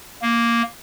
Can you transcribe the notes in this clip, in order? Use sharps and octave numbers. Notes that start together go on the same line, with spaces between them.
A#3